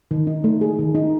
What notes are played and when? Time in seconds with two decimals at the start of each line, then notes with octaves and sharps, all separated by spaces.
0.11 D#3
0.27 D#4
0.44 A3
0.61 G#4
0.79 D#3
0.95 D#4